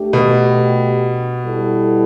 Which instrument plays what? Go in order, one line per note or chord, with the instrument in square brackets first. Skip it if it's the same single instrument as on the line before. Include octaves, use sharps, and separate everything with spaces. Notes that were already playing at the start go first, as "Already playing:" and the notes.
Already playing: [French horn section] A3 D4 G4
[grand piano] B2
[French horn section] G3 B3 E4 A4